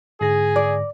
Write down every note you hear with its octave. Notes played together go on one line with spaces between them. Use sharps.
G#2 D3 G#4 A#6
D5